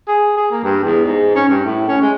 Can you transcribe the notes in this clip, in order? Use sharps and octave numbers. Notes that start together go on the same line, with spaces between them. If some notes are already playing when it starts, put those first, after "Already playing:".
G#4
G#4
A#3
G2
E2
G#2
C#4
G2
A2
C#4
G#3